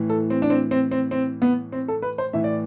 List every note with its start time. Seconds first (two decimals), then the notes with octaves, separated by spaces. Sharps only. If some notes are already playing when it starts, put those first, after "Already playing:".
Already playing: A2 E3
0.09 A4
0.30 C4
0.42 D4
0.50 C4
0.71 C4
0.91 C4
1.11 C4
1.42 B3
1.72 C4
1.88 A4
2.02 B4
2.18 C5
2.33 A2 E3 E5
2.44 D5